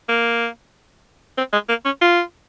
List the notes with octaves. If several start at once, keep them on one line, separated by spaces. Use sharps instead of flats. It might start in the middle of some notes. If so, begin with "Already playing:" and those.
A#3
C4
G#3
A#3
C#4
F4